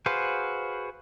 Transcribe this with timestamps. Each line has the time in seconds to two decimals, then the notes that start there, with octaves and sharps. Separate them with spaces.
0.06 F#4 G#4 B4 C5 F5